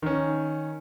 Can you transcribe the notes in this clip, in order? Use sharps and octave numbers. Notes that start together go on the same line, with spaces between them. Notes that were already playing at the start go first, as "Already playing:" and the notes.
D#3 C#4